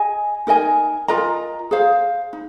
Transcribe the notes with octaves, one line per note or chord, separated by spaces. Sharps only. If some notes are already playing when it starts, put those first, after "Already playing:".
Already playing: G#4 D#5 G#5
D#4 A#4 D#5 G#5
F4 A#4 D#5 A#5
G#4 C5 F5
D#4